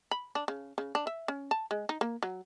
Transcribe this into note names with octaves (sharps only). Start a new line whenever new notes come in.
B5
D4
C#3
C#3
D4
E5
C#4
A5
G#3
D#4
A#3
F#3